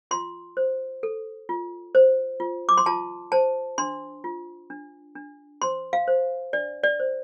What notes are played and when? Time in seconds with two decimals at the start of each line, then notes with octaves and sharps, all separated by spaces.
0.11 F4 C6
0.57 C5
1.03 A4
1.49 F4
1.95 C5
2.40 F4
2.69 D6
2.78 C6
2.86 F4 A5
3.32 C5 A5
3.78 D4 C6
4.24 F4
4.70 D4
5.15 D4
5.62 C5 C6
5.93 F5
6.08 C5
6.53 D4 D5
6.84 D5
7.00 C5